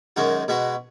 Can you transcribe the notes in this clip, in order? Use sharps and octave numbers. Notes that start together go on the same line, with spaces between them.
F#2 D#3 G#3 D#4 F#4
B2 G#3 B3 F#4